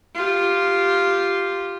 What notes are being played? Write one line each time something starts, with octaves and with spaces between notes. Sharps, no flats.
F4 G4